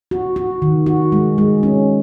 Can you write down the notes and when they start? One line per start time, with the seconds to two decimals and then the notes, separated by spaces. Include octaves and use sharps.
0.11 F#4
0.36 F#4
0.62 D#3
0.86 F#4
1.12 G#3
1.38 G#3
1.63 C#4